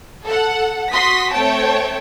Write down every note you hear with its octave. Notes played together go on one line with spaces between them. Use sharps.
A4 F#5
F#4 C6 D#6 B6
A3 C4 C#5 G5 A5